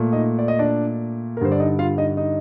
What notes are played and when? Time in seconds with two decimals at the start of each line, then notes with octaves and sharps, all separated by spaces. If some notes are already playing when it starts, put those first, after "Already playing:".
Already playing: A#2 A3
0.12 D#4 D#5
0.39 D5
0.48 D#5
0.59 D4 D5
1.37 A#4
1.41 G2 D3 G3 C5
1.52 D5
1.60 D#4 D#5
1.79 F4 F5
1.98 D#4 D#5
2.17 D#4 D#5